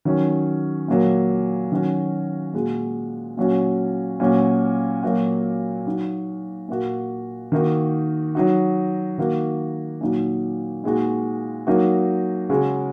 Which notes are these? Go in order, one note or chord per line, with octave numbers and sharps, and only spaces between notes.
D#3 F#3 C#4
A#2 F#3 A#3
D#3 F#3 C#4 F#4
A#2 G#3 F#4
A#2 F#3 C#4 F#4
A#2 F#3 C#4 F#4
A#2 F#3 A#3 F#4
F#3 D#4 F#4
A#2 A#3 F#4
D#3 A#3 D#4 F#4
F#3 D#4 F#4
D#3 A#3 F#4
A#2 F#3 D#4 F#4
A#2 G#3 D#4 F#4
F#3 A#3 D#4 F#4
C#3 G#3 C#4 F#4